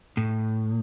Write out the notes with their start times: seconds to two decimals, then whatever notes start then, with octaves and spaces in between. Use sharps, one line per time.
0.17 A2